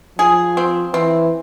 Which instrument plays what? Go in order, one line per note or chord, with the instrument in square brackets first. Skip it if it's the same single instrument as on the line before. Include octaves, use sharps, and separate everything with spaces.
[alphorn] F3 [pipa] G#4
[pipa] C4
[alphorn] E3 [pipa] C4